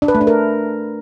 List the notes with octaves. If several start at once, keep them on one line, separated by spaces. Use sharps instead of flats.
D4
B4
A3
D4
A#4